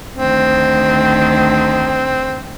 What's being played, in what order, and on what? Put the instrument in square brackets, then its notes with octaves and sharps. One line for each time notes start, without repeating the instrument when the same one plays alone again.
[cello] D2 D#3 [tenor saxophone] C4